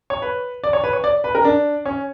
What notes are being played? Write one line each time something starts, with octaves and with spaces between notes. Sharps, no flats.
C#5
B4
D5
C#5
B4
C#5
D5
B4
A#4
D4
C#4